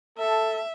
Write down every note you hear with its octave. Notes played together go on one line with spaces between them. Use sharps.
A4 E5